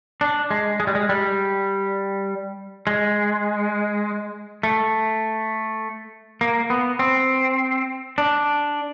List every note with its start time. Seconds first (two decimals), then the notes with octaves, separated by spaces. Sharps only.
0.21 D4
0.51 G#3
0.80 G#3
0.87 G3
0.95 G#3
1.09 G3
2.87 G#3
4.63 A3
6.41 A#3
6.70 B3
6.99 C4
8.18 D4